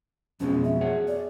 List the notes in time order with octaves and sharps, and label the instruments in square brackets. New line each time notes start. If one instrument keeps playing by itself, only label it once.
[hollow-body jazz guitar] F2 B2 G#3 [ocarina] C#4
[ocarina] E5
[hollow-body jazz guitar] G#4 C#5 F#5
[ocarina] D5